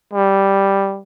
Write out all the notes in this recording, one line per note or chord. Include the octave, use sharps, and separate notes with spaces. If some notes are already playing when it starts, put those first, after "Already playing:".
G3